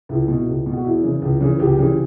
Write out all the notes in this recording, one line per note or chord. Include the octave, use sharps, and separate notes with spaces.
C#2 E4
B2
C#2
B2
F#4
E2 E4
C#3 E3
C#2
C#3 E3
C#2 G4
C#3 E3